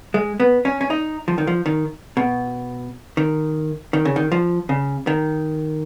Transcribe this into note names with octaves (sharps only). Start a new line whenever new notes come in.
G#3
B3
C#4
C#4
D#4
F3
D#3
F3
D#3
B2
D#3
D#3
C#3
D#3
F3
C#3
D#3